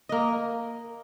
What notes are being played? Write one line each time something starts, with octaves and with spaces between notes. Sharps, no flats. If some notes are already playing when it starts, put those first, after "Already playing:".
A#3 D#5